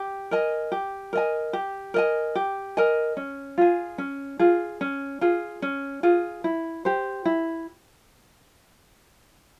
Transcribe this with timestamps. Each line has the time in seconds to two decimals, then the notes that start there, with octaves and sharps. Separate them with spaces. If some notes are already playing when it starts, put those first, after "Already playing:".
Already playing: G4
0.31 A#4 D#5 G#5
0.72 G4
1.13 A#4 D#5 G#5
1.53 G4
1.94 A#4 D#5 G#5
2.36 G4
2.77 A#4 D#5 G#5
3.17 C#4
3.58 F4 G#4
3.98 C#4
4.39 F4 G#4
4.81 C#4
5.21 F4 G#4
5.62 C#4
6.03 F4 G#4
6.44 E4
6.85 G4 C5
7.25 E4